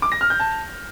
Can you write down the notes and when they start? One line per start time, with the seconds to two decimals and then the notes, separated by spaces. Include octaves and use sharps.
0.02 D6
0.12 A#6
0.21 F6
0.30 G6
0.40 A5